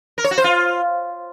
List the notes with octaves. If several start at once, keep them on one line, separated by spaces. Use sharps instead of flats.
A#4
C#5
F#4
C5
F4